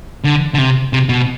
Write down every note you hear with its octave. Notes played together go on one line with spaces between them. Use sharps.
D3
D3
C3
C3
B2